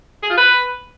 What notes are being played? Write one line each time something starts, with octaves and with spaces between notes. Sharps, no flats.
G#4
F4
B4